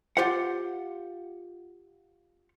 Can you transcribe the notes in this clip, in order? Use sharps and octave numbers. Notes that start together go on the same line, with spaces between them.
F4 G4 C5 F5 F#5